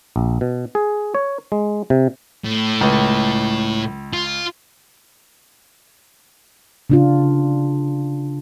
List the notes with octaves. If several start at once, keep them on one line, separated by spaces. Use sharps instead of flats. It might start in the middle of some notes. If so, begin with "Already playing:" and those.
A#1
B2
G#4
C#5
G#3
C3
A2
C#2
F4
C#3 D4 F4